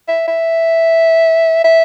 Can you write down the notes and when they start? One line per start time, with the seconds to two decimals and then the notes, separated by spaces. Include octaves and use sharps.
0.08 E5
0.28 E5
1.65 E5